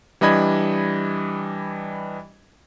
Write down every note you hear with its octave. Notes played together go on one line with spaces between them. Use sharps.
E3 G3 D4 D#5 B5 G#6